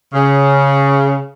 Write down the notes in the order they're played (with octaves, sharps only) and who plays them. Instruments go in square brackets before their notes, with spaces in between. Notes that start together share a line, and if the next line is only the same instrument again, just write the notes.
[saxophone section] C#3